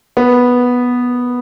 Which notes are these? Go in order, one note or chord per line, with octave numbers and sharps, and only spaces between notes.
B3